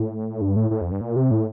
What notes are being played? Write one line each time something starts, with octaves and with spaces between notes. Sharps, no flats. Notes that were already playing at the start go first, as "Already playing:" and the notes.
Already playing: A2
G2
A2
A2
F2
G2
A#2
C3
A2